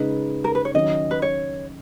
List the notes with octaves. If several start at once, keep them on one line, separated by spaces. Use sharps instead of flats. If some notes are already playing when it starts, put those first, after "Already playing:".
Already playing: C#3 G#3 D#4 B4
A#4
B4
C#5
D#3 F#3 C#4 D#5
B4
C#5